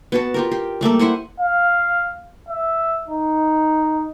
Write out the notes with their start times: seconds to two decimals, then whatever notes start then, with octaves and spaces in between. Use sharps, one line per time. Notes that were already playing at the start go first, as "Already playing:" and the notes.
0.12 B3 F#4 A5
0.34 F4 G4 A#4
0.51 G4
0.81 G3 A3 A#3 A4
0.99 E4 C5 F#5 G#5
1.40 F5
2.49 E5
3.08 D#4